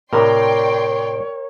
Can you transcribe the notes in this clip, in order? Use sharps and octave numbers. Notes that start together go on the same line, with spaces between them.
A2 C3 A#4 C#5 D5 G5 C6